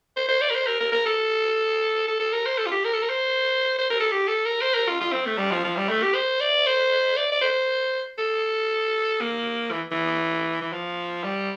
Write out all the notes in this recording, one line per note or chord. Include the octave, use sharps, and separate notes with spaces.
C5
C5
D5
A#4
C5
A#4
A#4
A#4
A4
A4
A4
A#4
C5
A4
F4
G4
A#4
A4
A#4
C5
C5
A#4
A4
G4
A4
A#4
C5
A#4
F4
F4
C4
A3
G3
F3
F3
G3
A3
G4
C5
D5
C5
D5
D5
C5
A4
A#3
E3
E3
E3
F3
G3